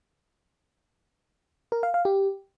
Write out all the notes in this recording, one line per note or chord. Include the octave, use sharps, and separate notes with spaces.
A#4
F5
F5
G4